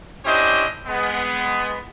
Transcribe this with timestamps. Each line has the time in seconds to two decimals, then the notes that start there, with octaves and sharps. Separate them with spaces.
0.25 C#4 D4 E4 G4 C5 D#5
0.86 G#3 B3